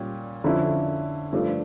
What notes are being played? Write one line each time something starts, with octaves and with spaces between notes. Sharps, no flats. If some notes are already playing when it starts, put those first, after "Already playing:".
Already playing: A#2 G3 C#4
F2 D3 F3 C#4 E4
G2 F3 A3 D4